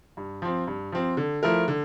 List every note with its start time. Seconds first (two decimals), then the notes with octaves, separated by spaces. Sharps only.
0.17 G2
0.42 F3 C4
0.67 G2
0.92 F3 C4
1.17 D3
1.43 F3 A3 E4 A#4
1.68 D3